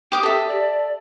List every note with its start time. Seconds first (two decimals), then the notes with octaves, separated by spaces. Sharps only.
0.12 G4 G5 D6 D#6
0.23 G4 A4 E5
0.48 D5